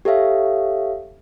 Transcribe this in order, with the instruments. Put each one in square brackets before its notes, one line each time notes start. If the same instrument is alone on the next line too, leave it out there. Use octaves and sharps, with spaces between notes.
[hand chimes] G4 A4 C#5 E5 F5